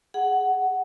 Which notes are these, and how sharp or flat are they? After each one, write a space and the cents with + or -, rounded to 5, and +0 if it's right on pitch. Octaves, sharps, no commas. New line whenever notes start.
G#4 +0 F#5 +10